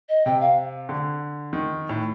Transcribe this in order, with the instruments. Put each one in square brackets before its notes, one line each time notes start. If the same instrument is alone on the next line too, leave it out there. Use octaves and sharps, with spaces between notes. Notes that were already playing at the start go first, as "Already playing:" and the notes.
[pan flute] D#5
[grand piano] C3 [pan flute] G5
[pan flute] F5
[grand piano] D3
D#3
A2